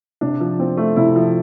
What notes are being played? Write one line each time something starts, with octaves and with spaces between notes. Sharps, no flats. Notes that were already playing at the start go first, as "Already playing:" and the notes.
C3 D4
F3
C4
A3
C3 E4
F3